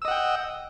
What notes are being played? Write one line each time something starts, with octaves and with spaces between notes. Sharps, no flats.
D#5 F#5 G5 E6